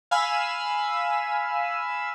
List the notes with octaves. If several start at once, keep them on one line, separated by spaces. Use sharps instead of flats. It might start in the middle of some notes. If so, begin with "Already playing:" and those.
F5 G#5 B5 E6